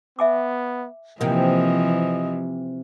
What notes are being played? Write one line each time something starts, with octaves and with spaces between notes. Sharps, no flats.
B3 E5 G#5 D6
C3 E3 F3 A#3 D#5